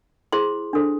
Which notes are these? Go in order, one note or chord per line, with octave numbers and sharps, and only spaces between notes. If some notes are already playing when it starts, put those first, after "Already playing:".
E4 G#4 C5 C6
D4 A4 C5